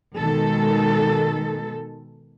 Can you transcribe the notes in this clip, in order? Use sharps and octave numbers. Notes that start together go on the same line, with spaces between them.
B2 D#3 G#3 A4